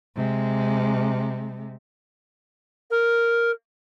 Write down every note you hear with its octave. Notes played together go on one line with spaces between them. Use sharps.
C3 G#3
A#4